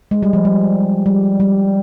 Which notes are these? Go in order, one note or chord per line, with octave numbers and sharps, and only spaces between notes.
G#3
G3
F3
G3
G3
G3